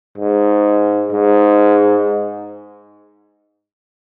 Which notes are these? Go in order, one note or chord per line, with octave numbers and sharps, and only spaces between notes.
G#2
G#2